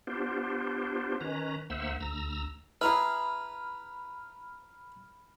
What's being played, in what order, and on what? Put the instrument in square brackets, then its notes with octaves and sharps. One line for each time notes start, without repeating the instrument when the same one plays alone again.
[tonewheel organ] B3 D4 F4 G4 C5
D#3 C#4 B4 A#5
D2 A#3 C5 E5 F#5 E6
D2 A#5 E6
[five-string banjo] E4 G#4 [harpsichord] B4 A#5 [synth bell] B5 F6